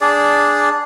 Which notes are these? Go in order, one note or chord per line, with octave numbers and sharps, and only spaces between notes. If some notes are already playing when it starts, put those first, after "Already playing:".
D4 G#4 D5